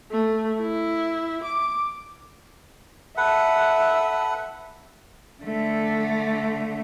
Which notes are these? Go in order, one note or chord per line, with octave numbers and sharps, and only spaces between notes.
A3
E4
D6
A4 B4 E5 F#5
D3 A3